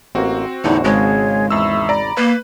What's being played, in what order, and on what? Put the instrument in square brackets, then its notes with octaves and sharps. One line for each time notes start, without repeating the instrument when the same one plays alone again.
[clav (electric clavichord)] A1 A#3 [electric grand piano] C4 F#4
[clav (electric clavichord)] E2 A2 D3 [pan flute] D#4
[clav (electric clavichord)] G#1 C#3 A5 [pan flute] G#3 [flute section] G#4 C#5 F5
[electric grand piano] E2 E6 [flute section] E5 B5 C#6
[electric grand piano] D5 A#5 [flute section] B5
[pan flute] A#3 [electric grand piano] B4